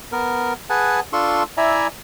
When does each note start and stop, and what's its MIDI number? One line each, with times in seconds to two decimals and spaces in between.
0.12 0.53 59
0.12 0.53 70
0.70 1.00 68
0.70 1.00 71
0.70 1.00 78
0.70 1.00 80
0.70 1.00 81
1.13 1.43 62
1.13 1.43 65
1.13 1.43 69
1.13 1.43 84
1.13 1.43 85
1.57 1.87 64
1.57 1.87 74
1.57 1.87 76
1.57 1.87 80
1.57 1.87 82